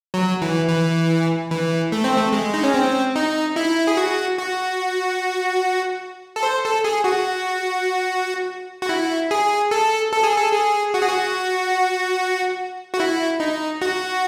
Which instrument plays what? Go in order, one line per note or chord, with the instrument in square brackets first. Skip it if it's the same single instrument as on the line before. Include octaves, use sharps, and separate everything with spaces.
[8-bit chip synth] F#3
E3
E3
E3
A3
C4
A3
G#3
D#4
C#4
C4
D#4
E4
G#4
F#4
F#4
A4
C5
A4
G#4
F#4
F#4
E4
G#4
A4
A4
G#4
A4
G#4
F#4
G#4
F#4
F#4
E4
D#4
F#4